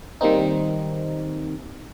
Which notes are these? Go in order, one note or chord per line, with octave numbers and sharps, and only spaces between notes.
D#3 G3 A#3 C4 D#4